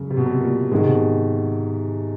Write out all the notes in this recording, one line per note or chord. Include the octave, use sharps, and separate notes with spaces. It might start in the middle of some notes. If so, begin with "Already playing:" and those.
Already playing: F#2 C#3
C3
B2
C3
A#2
G#2 B2 D#3 G#3
C3
B2